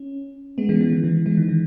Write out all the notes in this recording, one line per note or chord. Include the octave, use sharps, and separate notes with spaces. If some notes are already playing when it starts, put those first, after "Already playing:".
Already playing: C#4
G#3 B3
E3 G#3
E3
D#3
E3
E3 G#3
D#3
E3